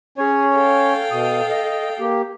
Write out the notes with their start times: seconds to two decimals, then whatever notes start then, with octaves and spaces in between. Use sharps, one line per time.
0.18 C#4 G#4 C#5
0.55 A4 F5 G5
1.11 B2 D#6
1.50 D#5
2.00 A#3 G4